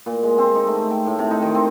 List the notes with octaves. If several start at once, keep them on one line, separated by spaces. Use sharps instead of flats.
A#2
G#3
C4
D#4
A3
G5
A2
C3
D#4
D#3
C4